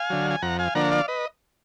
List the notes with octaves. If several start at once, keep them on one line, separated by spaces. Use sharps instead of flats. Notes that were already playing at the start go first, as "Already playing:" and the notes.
Already playing: F5 G#5
D3 F#3
G#5
F2 F#5 A#5
F5 G#5
D3 F3 A#3 D4 F#5 A#5
D5 F5
B4 D#5